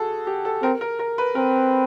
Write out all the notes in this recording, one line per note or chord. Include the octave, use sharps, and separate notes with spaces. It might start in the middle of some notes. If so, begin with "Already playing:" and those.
Already playing: F#4 G#4 A4
G4
A4
C4 A#4
A#4
A#4
B4
C4 A#4